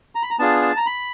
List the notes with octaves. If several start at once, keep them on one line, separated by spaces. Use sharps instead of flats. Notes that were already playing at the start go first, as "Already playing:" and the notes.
A#5
B5
A#5
B3 D4 F4 G#4 A5
A5
A#5
B5